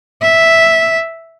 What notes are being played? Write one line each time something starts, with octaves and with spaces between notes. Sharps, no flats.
E5